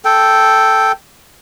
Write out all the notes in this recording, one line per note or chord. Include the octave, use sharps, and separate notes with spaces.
A4 G5